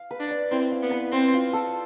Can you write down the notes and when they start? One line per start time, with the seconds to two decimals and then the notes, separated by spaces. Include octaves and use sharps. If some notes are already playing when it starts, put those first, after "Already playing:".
Already playing: F5
0.11 B4
0.20 D4
0.31 D5
0.51 C4 E4
0.72 F5
0.82 B3
0.91 B4
1.12 C4 C5
1.34 F4
1.53 A4